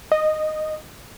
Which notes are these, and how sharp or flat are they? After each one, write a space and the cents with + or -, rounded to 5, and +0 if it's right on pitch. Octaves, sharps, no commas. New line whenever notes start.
D#5 -10